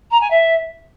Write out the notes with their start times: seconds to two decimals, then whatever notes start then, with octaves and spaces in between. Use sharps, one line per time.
0.11 A#5
0.21 G#5
0.30 E5